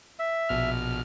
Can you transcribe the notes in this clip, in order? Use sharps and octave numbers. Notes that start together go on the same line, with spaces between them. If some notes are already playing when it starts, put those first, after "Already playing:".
E5
A#1 B2 F6